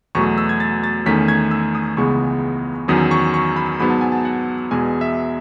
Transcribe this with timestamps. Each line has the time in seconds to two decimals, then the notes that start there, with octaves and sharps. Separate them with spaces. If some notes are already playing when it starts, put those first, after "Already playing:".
0.15 E2 B2 F#3 A3 C#6
0.38 E6
0.49 G#6
0.60 A6
0.84 A6
1.06 E2 D#3 A3 C#4 B6
1.28 G#6
1.51 E6
1.75 D#6
1.97 C#2 C#3 E3 G#3 B3 C#6
2.88 E2 D#3 F#3 C#4 D#6
3.11 C#6
3.34 C#6
3.56 B5
3.80 G#2 F#3 B3 B5
3.90 A5
4.01 G#5
4.12 A5
4.25 F#5
4.71 E2 B2 G#3 G#5
5.01 E5